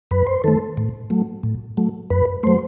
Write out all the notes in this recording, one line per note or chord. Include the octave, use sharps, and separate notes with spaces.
F#2 B4
C5
D#3 A3 A4
A2
F#3 A3
A2
F#3 A3
F#2 B4
F#3 A3 C5